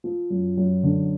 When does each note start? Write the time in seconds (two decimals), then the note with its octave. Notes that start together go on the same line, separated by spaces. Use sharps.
0.04 F3
0.30 F#2
0.57 F#2
0.83 D3